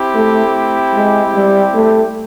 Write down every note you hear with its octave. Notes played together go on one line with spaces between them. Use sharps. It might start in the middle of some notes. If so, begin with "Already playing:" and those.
Already playing: C4 E4 G4
A3
G#3
G3
A3